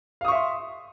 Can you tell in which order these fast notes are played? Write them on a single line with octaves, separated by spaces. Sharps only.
F5 D#6 C#6 E5 C6